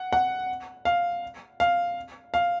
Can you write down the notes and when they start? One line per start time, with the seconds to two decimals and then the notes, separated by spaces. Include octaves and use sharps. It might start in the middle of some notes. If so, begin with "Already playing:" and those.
Already playing: F#5
0.13 F#5
0.85 F5
1.60 F5
2.34 F5